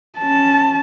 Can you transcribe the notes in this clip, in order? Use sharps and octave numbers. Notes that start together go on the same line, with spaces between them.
C#4 A5